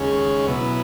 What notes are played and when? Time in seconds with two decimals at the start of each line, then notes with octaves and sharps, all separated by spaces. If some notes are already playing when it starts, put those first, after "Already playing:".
Already playing: D#2 C#3 G#3 C#4 G#4
0.47 B2 F#3 B3 E4